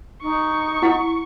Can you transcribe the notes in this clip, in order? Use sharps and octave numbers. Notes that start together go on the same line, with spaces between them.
D#4 C#6
E4 F#5